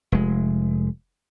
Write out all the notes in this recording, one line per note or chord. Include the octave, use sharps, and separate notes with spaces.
F1 G#3